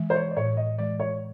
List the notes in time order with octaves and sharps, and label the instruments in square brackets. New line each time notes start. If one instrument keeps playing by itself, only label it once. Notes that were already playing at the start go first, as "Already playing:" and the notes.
Already playing: [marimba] E3 G#3
[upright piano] C5
C#5
D5
[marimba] A2 [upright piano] C#5
[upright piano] D#5
[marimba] E3 G#3 [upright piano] D5
[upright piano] C#5